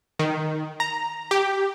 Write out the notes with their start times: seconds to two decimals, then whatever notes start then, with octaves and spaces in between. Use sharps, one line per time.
0.19 D#3
0.80 A#5
1.31 G4